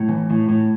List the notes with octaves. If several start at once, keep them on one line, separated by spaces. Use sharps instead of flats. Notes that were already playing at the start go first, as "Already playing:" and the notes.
Already playing: A2
E3
A2
A2